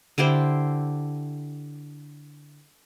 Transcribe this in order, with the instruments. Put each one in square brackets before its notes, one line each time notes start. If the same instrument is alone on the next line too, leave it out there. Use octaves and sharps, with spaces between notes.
[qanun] D3 E4 G4 C5